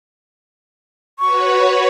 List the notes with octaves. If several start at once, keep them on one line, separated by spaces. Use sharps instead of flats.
F#4 B4 C#5 C#6